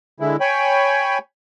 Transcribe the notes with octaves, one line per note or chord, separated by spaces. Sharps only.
D3 G#3 E4
C#5 G5 G#5 B5